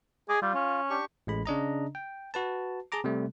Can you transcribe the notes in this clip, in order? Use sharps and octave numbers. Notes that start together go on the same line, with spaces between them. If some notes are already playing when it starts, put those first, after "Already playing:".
G#4 D#5 D6
G3 F4
C#4
D4 G4 C#6
A1 G#3 B5
C#3 D4 D#5 A#5
G5
F#4 B4 A5
G#4 A5 A#5 D6
C3 G3 A3